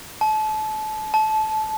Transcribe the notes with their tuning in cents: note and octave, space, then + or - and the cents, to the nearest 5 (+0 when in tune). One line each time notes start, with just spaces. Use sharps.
A5 -30
A5 -20